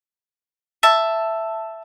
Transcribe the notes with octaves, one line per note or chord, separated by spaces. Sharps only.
E5 A5